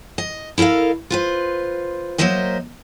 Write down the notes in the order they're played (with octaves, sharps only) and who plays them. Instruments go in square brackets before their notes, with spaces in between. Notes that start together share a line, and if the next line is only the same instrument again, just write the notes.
[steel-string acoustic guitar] D#5
E4 A4 A#4 D#5 F5
F4 B4 C5
F#3 A3 A#3 C5 D#5 E5